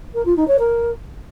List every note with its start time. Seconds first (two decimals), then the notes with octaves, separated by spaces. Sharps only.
0.14 A#4
0.26 F4
0.37 D#4
0.48 C#5
0.59 A#4